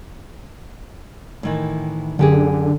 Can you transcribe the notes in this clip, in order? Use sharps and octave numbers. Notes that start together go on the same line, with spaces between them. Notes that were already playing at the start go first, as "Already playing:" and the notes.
A2 D#3 E3
F#2 D3 G4 G#4